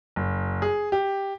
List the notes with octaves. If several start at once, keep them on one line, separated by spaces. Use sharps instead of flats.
F#1
G#4
G4